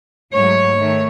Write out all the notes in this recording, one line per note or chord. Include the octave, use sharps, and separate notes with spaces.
G#2 F#3 A3 C#5
D#3 A3